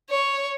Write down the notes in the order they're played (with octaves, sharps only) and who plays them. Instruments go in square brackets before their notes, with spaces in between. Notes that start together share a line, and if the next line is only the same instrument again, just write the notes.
[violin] C#5